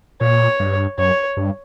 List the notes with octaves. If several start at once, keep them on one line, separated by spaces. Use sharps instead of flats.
A#2 C#5
G2
F#2 C#5
G2